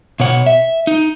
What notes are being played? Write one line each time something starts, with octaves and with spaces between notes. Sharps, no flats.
B2 C#5 F#5
E5
D#4